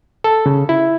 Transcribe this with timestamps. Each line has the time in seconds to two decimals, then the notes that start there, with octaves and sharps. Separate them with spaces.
0.24 A4
0.46 C#3
0.69 E4